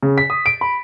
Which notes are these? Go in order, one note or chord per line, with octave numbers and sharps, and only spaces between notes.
C#3
B6
D#6
D7
B5